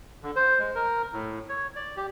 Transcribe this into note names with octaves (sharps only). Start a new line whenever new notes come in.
D3
C5
G#3
A#4
A2
C#5
D5
G4